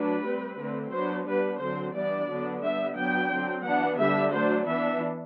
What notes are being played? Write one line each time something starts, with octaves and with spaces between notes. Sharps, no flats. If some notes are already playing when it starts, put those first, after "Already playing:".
Already playing: F#3 A3 D4 B4
G3 C4
D3 A3 C4
F#3 B3 D4 C5
G3 B3 D4 B4
D3 F#3 C4 C5
E3 G3 B3 D4 D5
D3 F#3 B3 D4
G3 B3 D4 E5
F#3 B3 D4 G5
D3 F#3 C4
E3 B3 D4 F#5
D3 G3 D4 E5
F#3 A3 D4 C5
E3 B3 D4 E5